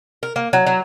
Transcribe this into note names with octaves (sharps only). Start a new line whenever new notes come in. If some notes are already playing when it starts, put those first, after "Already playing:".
A#4
A#3
F#3
F#3